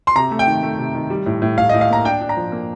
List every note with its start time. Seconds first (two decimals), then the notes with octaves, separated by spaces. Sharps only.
0.07 C6
0.15 C3 A#5
0.31 A3
0.39 G5
0.47 D#3
0.63 A3
0.78 C3
0.94 D#3
1.10 G3
1.26 A2
1.42 A2
1.58 A2 F5
1.69 D#5
1.74 A2
1.81 F5
1.90 A#3 A#5
2.05 D4 G5
2.21 D4
2.29 A#5
2.37 F3
2.52 A#3